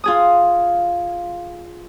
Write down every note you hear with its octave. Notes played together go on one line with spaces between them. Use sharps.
F4 G#4 D#6